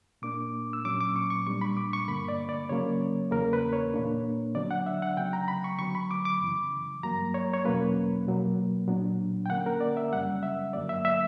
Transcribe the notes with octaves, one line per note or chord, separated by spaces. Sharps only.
A#2 A#3 D4 D6
E6
A#2 F#3 C#4 D6
D6
C#6
C#6
A#2 G3 B3 D4 C#6
B5
D6
C#6
G2 D3 A#3 B5
D5
D5
C#3 F#3 A#3 C#4 C#5
E2 C#3 E3 A#3 C#4 A#4
B4
C#5
A#2 A#3 D4
D3 F#3 B3 D4 D5
F#5
E5
F#5
C#3 F#3 B3 G5
A#5
B5
C#6
D3 F#3 B3 C#6
B5
D6
D6
F#2 C#3 E3
G2 F#3 A#3 A#5
C#5
C#5
E2 B2 F#3 A#3 C#4 B4
B2 F#3 A#3
A#2 F#3 B3 D4
G5
D3 A#3 C#4 F#5
A#4
D5
E5
F#2 C#3 G3 C#4 F#5
E5
G2 D3 F#3 A#3 D5
E5
E5